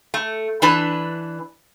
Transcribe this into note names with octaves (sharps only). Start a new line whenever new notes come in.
A3
E3 D4 B4